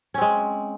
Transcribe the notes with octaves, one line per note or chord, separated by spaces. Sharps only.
G#3 C4 C#4